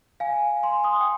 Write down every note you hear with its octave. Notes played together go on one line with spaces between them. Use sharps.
F5 G#5
G#5 C6
C6 D#6
G5